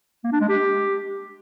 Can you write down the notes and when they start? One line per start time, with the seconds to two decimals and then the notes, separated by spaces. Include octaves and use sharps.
0.24 A#3
0.32 D4
0.41 G#3
0.49 G4